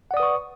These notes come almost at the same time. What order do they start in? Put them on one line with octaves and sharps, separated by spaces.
F#5 D5 D#6 B4 C#6